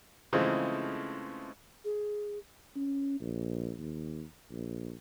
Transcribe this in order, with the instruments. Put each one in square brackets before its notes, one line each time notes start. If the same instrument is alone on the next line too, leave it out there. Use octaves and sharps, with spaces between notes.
[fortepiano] C#3 E3 F3 G#3 A3 C4
[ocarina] G#4
[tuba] C#4
A#1
D#2
A#1